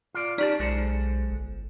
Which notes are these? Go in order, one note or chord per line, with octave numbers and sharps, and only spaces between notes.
F4 D5
C#4 D#4 G4 D5 A5
B1 G#3 A4 C5
G1